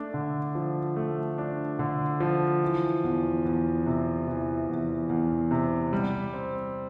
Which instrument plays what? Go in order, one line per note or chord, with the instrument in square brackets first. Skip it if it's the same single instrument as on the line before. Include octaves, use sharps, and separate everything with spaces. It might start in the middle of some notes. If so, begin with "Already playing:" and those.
Already playing: [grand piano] A3 D4
D3
F3
A3
D4
D3
F3
E3
E2
E2
C3
E3
E2
E2
C3
G3
C4